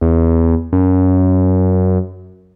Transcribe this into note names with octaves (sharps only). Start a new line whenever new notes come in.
E2
F#2